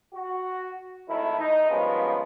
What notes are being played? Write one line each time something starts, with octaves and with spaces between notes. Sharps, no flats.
F#4
G#1 D#3 A3 E4
D#4
G2 D#3 F3 G#3 B3 C#4